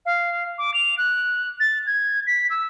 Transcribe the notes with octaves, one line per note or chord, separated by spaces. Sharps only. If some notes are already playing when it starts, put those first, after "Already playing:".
F5
D6
F7
F#6
A6
G#6
B6
E6